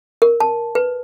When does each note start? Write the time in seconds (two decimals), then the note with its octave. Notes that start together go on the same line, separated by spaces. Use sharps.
0.22 A#4
0.40 A5
0.75 B4